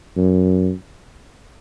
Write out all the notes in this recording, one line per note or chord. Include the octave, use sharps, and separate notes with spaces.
F#2